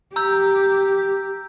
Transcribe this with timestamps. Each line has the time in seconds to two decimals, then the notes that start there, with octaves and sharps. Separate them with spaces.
0.16 G4 A#5 E6 G6